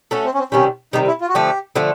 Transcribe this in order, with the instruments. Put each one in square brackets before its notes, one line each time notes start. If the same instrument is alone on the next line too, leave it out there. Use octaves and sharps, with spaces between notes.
[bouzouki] A3 C#4 F#4 A4
[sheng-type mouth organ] C4
C#4
C4
[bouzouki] C3 D#3 G3 [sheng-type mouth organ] C#4
[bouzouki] C3 D#3 G3 [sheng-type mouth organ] D#4
[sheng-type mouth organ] E4
F4
F#4
[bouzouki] D3 F3 A3 [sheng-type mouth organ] G4
[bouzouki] D3 F3 A3